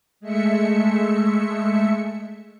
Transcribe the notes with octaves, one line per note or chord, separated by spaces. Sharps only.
G#3 A3 E5 C#7